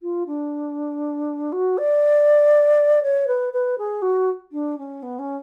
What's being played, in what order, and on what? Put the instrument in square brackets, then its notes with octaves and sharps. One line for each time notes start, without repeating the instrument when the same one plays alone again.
[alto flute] F4
D4
F#4
D5
C#5
B4
B4
G#4
F#4
D4
C#4
B3
C#4